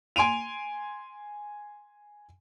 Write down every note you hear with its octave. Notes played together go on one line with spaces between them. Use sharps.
G#5 C6 D7 D#7 F7